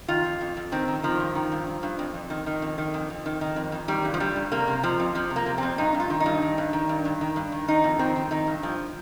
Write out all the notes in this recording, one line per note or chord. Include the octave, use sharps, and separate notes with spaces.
D#3 F4
F2
F2
F2
D#3 C4
D#3
D#3 F3
G2
D#3
G2
G2
G2
F2
F2
D#3
D#3
F2
D#3
F2
F2
D#3
D#3
F2
F2
D#3 G3
G2
F3
G2 G3
G2
C3 A#3
C3
F2 F3
F2
F2 F3
C3
A#3
C3
F2 C4
G2 D#4
G2
F4
D#3
D#4
G2
D#3
G2
D#3
G2
G2
D#3
G2
D#3
D#3 D#4
F2
D#3 C4
D#3
D#3 D#4
G2
G2 F3